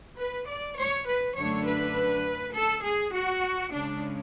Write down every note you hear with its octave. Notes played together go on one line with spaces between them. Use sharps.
B4
D5
C#5
B4
F#2 D3 A3 D4 C#5
B4
A4
G#4
F#4
C#3 G#3 C#4 D4